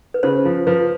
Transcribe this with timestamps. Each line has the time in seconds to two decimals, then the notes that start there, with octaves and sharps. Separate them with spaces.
0.14 B4
0.23 C#3 C5
0.45 F3
0.67 F3 B4